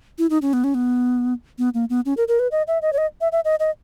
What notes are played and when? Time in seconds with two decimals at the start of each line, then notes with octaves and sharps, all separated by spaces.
0.18 E4
0.30 D#4
0.42 C#4
0.53 B3
0.64 C#4
0.75 B3
1.59 B3
1.74 A#3
1.90 B3
2.06 C#4
2.17 A#4
2.28 A#4
2.39 B4
2.52 D#5
2.67 E5
2.82 D#5
2.93 C#5
2.98 D#5
3.21 E5
3.32 E5
3.45 D#5
3.60 D#5